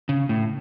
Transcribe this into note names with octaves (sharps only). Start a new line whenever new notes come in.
C#3
A2